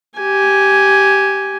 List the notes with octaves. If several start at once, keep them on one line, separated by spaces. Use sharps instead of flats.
G4 G#5